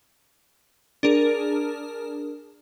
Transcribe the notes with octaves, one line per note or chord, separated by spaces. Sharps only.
D4 G#4 A#4